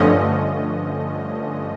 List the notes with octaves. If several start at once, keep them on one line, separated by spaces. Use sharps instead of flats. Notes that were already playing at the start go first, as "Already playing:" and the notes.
Already playing: G2 D3 F3 A3 C#4 D#5